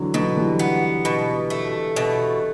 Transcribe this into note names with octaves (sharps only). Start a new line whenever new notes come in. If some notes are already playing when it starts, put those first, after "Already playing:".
Already playing: D3 E3 F#3
B2 D3 F#3
E3 G3
B3
B2
A3
B2